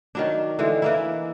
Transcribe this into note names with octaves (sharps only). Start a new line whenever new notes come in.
D#3 F#3 D4
D3 E3 G#3
E3 A#3 E4